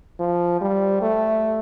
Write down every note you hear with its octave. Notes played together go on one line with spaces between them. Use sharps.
F3
G3
A3